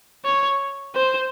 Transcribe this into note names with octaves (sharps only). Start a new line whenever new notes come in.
C#5
C5